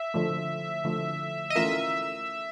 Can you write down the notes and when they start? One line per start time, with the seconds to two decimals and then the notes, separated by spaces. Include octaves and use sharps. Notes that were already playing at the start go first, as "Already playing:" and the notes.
Already playing: E5
0.14 D3 F3 A3
0.84 D3 F3 A3
1.50 D#5
1.56 E3 A3 C#4 F4 A#4 E5